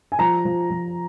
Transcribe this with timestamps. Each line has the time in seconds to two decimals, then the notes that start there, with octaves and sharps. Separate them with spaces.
0.12 G#5
0.19 F3 A#5
0.45 F3
0.70 F3